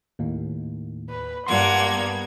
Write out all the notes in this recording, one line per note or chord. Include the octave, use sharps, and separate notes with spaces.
D#2 A2
B4
G2 A#3 F#5 C6 G#6
B3